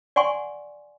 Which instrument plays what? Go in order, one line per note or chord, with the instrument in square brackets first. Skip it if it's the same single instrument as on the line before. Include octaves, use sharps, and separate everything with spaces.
[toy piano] D5 F#5 G#5 C6 C#6